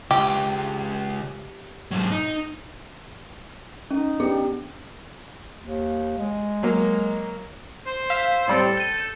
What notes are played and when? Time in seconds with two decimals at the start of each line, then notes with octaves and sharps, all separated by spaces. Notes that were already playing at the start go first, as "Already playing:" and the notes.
0.11 C#2 G4
1.91 G#2 F#3
2.12 D#4
3.91 C#4 D#4
4.20 B3 D4 G4 G#4
5.62 D#2
6.18 G#3
6.63 F#3 A#3
7.87 C5
8.10 F5 E6 B6
8.48 A2 G3 C4 A4
8.77 G6 D#7